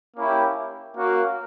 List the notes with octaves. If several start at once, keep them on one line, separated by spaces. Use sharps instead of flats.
A#3 C#4 E4 G4
A#3 C#4 F#4